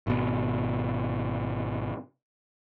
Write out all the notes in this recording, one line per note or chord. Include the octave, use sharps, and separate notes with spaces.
G#1 B2